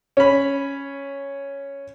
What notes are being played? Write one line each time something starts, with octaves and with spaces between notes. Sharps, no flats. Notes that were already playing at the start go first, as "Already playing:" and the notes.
C#4 B5